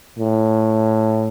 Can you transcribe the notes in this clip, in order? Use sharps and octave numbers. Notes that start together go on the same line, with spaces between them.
A2